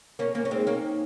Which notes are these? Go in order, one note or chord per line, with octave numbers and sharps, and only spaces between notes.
A#3 C#4 A#4
A#3 C#4 A#4
C#4
G#3 C4 D#4
A#3 C#4 A#4
D#4